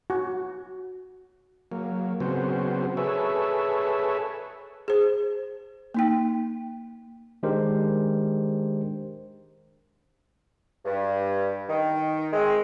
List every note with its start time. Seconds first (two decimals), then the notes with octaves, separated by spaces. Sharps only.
0.10 F#4
1.72 F#3 A#3
2.20 C#3 F#3 B3 C4 F#4 C5
2.97 G#4 A4 B4 C#5 E5
4.88 G#4 C5
5.94 A#3 D#4 G5
7.43 D#3 G#3 D4 G4 A#4 C5
10.85 G2
11.69 D#3
12.33 G#3 C4